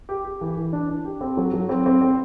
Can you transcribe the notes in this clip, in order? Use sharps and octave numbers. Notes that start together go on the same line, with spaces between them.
G4
G4
E3
E3
D4
D4
G4
C4
F#3
F#3
C4
C4
C4